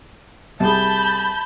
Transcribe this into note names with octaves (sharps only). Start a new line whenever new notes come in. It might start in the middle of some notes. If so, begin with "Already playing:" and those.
C2 G#4 A5 B5 G6